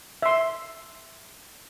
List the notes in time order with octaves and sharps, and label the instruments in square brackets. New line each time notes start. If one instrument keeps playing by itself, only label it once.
[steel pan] E5 C6